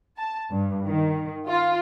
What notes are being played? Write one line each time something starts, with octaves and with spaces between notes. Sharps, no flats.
A5
G2
D#3
F4